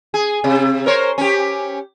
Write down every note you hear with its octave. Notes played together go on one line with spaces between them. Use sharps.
G#4
C3
A#4 C5 C#5
C#4 G4